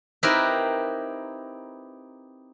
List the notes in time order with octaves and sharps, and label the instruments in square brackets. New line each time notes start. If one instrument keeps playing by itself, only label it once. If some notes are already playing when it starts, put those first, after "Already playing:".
[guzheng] C4 D#4 E4 G4 A#4 B4